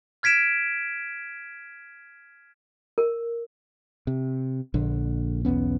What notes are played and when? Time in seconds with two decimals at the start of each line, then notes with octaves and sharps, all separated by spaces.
0.23 F6 G#6 B6 D7 E7
2.98 A#4
4.07 C3
4.74 A#1 D3
5.45 B1 E2 B3 C#4